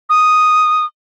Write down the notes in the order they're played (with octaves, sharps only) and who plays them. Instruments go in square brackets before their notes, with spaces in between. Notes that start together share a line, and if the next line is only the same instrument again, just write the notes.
[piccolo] D#6